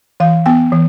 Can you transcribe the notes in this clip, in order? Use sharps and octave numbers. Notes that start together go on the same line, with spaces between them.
E3 F5
B3 G5
E3